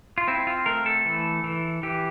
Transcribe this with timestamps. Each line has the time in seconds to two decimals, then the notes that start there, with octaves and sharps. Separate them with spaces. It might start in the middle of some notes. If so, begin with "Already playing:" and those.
0.18 F4
0.28 C4 E4
0.47 F4
0.66 A3 A#4
0.86 A4
1.06 E3
1.44 E3
1.83 E3 G4